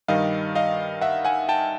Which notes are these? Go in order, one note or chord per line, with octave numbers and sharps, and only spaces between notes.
G2 D#3 G3 D#5 F5
D#5 F5
E5 F#5
F#5 G#5
G5 A5